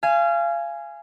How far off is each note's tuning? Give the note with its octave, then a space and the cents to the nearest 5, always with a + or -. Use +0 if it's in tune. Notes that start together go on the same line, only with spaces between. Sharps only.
F5 -30 G#5 +0